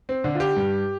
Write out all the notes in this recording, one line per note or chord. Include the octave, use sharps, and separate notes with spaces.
C4
D3 D4
F4
G4
G2